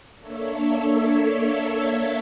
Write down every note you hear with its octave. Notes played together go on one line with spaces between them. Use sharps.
A#3 D4 A4 C#5 E5